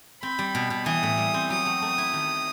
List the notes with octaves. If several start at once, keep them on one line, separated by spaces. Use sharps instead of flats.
C4 B5
G3
B2
B2
E3 D#6
A2
G3
C4
F#3 D#6
A3
A3
E4
D#3